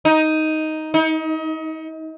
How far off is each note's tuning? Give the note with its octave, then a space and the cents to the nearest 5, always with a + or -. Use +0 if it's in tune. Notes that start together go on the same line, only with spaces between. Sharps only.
D#4 +5
D#4 +35